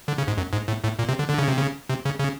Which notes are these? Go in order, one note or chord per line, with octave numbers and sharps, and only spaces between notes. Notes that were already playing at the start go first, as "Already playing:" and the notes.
D3
C#3
G#2
F#2
G#2
A2
A2
A#2
C3
D3
D3
C#3
C3
C#3
C3
C#3
C#3